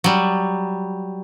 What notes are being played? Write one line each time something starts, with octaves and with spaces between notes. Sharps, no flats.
F#3 G3